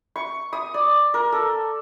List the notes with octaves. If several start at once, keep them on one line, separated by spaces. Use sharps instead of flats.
C#6
D#6
D5
A#4
A4